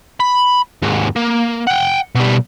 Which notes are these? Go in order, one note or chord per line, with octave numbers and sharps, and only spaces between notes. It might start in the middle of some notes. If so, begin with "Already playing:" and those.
B5
D#2 G#2
A#3
F#5 G5
B2 G3